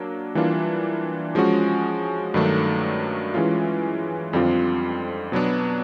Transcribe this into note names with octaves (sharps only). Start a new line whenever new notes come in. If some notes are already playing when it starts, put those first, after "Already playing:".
Already playing: F#3 A#3 D4
E3 G3 A#3 D4 F4
F3 G#3 C#4 F#4
G2 D#3 F#3 A3 D4
E3 G#3 C#4 F4
F2 D3 G3 C4 F4
B2 F#3 B3 D4